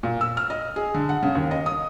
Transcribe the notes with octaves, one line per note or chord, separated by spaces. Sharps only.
A#2
E6
F6
D#5
G#4
D3
F#5
C#3
D#2
D#5
D#6